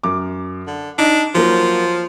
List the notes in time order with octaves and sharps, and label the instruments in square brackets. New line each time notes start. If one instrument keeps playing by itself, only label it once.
[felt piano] F#2 D6
[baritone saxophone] D3
[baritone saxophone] D4 [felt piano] D#4
[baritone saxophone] F3 [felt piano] F#3 A#3